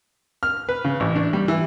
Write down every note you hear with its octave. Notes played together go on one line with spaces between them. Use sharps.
F6
B4
C#3
A1
D4
G3
E3